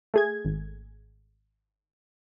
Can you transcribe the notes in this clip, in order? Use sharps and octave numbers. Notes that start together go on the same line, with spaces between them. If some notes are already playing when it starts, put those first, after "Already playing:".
A3 G#4 G#6
G#1